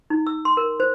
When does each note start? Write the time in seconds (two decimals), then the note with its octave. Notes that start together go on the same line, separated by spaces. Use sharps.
0.10 D#4
0.27 E6
0.45 C6
0.57 A#4
0.80 C5